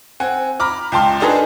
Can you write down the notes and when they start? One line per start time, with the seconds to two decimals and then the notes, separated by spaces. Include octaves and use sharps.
0.20 C4 F#5 G#5
0.60 A#5 B5 D6 F6
0.92 C#2 G5 A5 C6 F6
1.20 D4 D#4 G#4 A4 B4